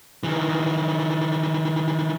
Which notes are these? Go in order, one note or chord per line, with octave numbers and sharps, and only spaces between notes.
D#3 E3